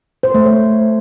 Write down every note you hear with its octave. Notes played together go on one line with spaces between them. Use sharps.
C5
A3
C#5